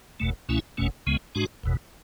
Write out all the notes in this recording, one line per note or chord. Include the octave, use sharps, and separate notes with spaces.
F#1 E2 B2 A3
C#2 B2 A3 C#4 E4
F#1 E2 B2 A3 C#4
C#2 C#3 G#3 B3
G#2 G#3 D4 F#4
F#1 E2 B2